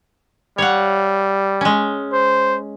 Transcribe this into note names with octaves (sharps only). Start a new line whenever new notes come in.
G3 C#5 F5 F#5
G#3 C#4
C5